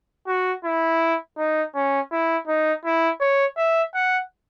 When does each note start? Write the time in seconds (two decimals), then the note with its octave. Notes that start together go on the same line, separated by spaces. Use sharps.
0.27 F#4
0.64 E4
1.38 D#4
1.75 C#4
2.12 E4
2.47 D#4
2.85 E4
3.20 C#5
3.57 E5
3.95 F#5